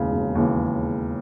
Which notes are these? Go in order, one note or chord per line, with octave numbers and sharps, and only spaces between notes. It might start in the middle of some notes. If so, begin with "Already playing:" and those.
Already playing: E1 D#2 C#3 E3
E1
D#2 C#3 E3